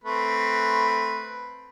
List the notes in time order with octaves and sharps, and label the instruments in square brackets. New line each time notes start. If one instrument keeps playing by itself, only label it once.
[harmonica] A3 C4 B4